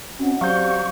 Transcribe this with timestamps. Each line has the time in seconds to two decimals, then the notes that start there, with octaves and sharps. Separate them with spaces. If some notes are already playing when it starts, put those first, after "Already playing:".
0.19 C4 C#4 F#4 D#5 F#5
0.41 F#3 G4 C5 D5 F5 C#6 G6